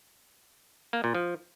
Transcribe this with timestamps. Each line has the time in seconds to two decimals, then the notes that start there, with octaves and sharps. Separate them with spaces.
0.93 A#3
1.04 A#2
1.15 F3